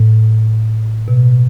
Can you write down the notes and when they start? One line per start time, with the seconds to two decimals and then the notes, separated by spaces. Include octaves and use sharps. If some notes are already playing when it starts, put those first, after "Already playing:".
Already playing: A2
1.08 B2